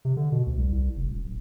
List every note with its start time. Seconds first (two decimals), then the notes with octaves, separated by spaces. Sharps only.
0.05 C3
0.17 D3
0.32 B2
0.46 D2
0.58 C2
0.73 C2
0.96 F1
1.09 D#1
1.24 D1